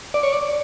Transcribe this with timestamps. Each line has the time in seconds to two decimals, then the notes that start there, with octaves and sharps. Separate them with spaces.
0.14 D5
0.23 C#5
0.33 D5